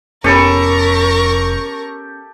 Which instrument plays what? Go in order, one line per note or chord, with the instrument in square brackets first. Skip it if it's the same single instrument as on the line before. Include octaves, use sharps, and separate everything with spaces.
[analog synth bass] F1 [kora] B3 C#4 [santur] G4 A4 [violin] A#4 C#6